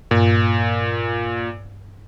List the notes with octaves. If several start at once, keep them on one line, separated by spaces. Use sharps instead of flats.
G2 A#2